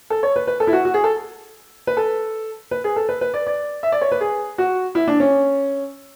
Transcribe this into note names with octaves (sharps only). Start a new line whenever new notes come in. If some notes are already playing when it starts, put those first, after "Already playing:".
A4
C#5
B4
B4
A4
E4
F#4
F#4
G#4
A4
B4
A4
B4
G#4
A4
B4
B4
D5
D5
E5
D5
C#5
B4
G#4
F#4
E4
D4
C#4